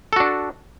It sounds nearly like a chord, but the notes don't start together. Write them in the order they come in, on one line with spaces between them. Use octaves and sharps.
A4 F#4 D4